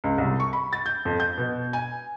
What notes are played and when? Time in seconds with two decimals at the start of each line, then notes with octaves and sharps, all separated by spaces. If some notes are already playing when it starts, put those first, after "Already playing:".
0.04 C#2
0.18 C2
0.40 C#6
0.53 B5
0.73 A6
0.86 G6
1.05 F2
1.20 G6
1.37 B2
1.73 G#5